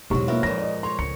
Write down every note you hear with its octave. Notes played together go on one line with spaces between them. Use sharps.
E1 G#2 B2 F#3 E4 G4 C#6
A#3 B3 F4 A#4 E5
F2 A#2 G#3 A#6
D5 D#5
C#5 A#5 C6
C#2 C#7